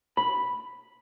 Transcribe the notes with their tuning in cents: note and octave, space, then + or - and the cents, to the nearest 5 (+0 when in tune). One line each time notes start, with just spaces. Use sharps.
B5 -5